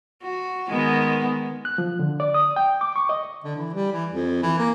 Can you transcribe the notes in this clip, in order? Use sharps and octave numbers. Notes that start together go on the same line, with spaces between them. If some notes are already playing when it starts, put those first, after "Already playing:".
F#4
D#3 G#3 B3
F#6
F3
D3
D5
D#6
G5
D6
C#6
D#5
D3
E3
G3
E3
F2
E3
A#3